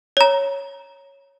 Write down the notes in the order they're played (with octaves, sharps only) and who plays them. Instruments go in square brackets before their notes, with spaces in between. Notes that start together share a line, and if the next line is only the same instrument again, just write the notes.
[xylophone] C#5 A#5